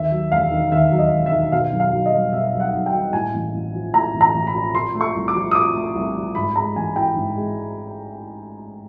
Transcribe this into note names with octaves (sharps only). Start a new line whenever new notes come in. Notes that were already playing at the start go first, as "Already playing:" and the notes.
Already playing: D#2 E5
F#3
E1 F5
D#3
D#2 E5
F#3
D#5
E1
E5
D#3
B2 F5
B1
F5
B1
D#5
G3
B2 E5
B1
F#5
B1
G5
G3
A2 G#5
A1
A1
F3
A2 A#5
A1
A#5
A1
B5
F3
A#2 C6
A3
C#6
C2
D6
F3
D#6
A#2 D6
A3
C2
F3
G#2 B5
G#3 A#5
A1 G#5
E3 G5
G#2
G#3